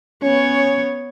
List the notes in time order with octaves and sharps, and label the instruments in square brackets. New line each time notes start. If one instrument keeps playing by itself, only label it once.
[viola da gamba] B3 C#5 [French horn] C#4